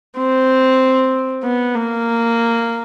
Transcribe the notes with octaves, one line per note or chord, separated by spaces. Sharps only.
C4
B3
A#3